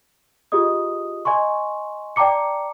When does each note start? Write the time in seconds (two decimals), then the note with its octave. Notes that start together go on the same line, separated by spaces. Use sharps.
0.52 F4 G4 G#4 D#5 D#6
1.25 D#5 G#5 C6 C#6
2.16 D5 G5 A5 A#5 D6 C#7